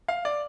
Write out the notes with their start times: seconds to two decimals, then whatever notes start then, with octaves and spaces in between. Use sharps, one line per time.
0.08 F5
0.25 D5